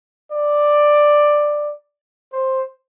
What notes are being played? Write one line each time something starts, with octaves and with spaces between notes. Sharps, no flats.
D5
C5